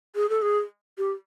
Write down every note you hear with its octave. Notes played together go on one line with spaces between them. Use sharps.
G#4
A4
G#4
G4